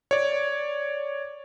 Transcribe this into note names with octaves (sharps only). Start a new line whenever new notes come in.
C#5 D5